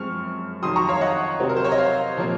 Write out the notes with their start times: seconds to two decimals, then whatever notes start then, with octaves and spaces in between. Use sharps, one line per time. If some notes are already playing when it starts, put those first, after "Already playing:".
Already playing: F#2 F3 G#3 C4 C#6 F6
0.62 F2 D#3 F#3 C6 D#6
0.76 A#5 C#6
0.88 C#5 F5
1.01 D#5 F#5
1.40 C3 F#3 C4
1.49 A#4
1.56 C5
1.65 C#5
1.72 D#5
1.78 C#5 F5
2.17 A#2 F3 A#3